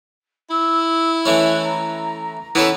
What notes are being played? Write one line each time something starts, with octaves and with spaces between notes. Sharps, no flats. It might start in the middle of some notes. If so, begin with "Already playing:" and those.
E4 E6
E3 A3 C#4 F#6
A#5
E3 B3 C#4 A4